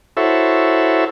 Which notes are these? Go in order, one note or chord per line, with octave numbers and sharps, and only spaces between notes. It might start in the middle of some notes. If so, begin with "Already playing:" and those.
E4 F#4 A4 C5 C#5 E5